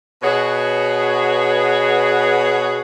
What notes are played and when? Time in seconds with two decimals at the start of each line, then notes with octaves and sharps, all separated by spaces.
0.23 B2 F#4 G#4 B4 C#5